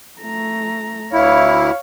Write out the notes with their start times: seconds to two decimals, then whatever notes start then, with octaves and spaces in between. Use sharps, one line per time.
0.21 A3 A#5
1.13 D2 E4 C#5 F5